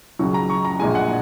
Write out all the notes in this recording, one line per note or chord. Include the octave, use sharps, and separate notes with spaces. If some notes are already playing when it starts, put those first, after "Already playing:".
C#2 C#3 F#3 C#6
A#5
C#6
A#5
A#1 A#2 G#3 G#5
F#5